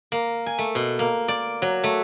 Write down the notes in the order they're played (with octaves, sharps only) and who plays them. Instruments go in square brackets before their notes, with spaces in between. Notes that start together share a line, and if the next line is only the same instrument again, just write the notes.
[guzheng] A#3
G#5
A3
B2
A#3
D5
F#3
A3